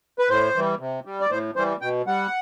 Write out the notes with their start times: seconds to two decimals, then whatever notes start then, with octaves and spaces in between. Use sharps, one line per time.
0.19 B4
0.29 A2 C5
0.55 E3 G3
0.80 C3
1.05 G3
1.21 D5
1.31 A2 C5
1.56 E3 G3 C5
1.82 B2 G5
2.07 G3 F#5